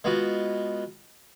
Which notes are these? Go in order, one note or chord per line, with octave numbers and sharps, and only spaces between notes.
G#3 B3 F4 F#4